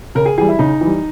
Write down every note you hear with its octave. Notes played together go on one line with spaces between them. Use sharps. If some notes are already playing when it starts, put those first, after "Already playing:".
C#3 A#4
G#4
E3 G3 G#4
E4
C#3 D#4
E3 G3